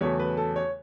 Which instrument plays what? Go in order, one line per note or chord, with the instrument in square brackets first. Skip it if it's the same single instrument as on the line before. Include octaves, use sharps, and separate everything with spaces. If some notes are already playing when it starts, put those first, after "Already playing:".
[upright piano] E2 C#3 F#3 A3 C#5
B4
A4
C#5